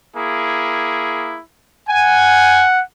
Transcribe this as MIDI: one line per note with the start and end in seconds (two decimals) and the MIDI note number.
0.15 1.39 58
0.15 1.39 64
0.15 1.39 68
1.89 2.83 78
1.89 2.68 80